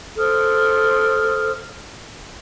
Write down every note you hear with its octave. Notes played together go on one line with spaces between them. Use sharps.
A4 C5 D#6 F6